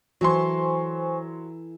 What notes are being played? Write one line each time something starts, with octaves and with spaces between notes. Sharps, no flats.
E3 F#3 E4 A4 C5 G#5 C6 C#6